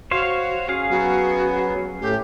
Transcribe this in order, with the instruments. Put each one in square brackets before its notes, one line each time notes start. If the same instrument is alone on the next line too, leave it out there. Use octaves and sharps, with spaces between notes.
[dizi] F#4 [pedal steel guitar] C5 C#5 F5
[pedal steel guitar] C#4 G#4 F5
[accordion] F#3 B3 [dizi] F#4
[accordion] A2 A3 [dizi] G4